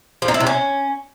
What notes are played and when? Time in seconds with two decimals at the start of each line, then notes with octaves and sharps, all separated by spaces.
0.22 F3
0.28 D#4
0.34 E4
0.40 C3
0.47 C#4